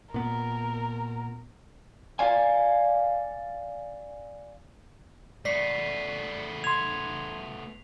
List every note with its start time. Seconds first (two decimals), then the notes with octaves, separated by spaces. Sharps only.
0.14 A#2 B3 A#4
2.19 D5 F5 G#5
5.45 A3 B3 D5 B6 C7
6.64 C6 G#6 F7